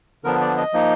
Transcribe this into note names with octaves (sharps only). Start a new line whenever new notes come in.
D3 F3 B3 D4 A#4
D5
D#5
F3 A#3 D#4